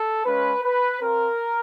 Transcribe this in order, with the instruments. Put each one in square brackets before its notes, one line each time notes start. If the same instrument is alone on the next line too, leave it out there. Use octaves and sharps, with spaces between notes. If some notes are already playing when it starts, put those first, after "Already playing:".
Already playing: [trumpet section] A4
G#3 C#4 F4 B4
B4
C4 F4 A#4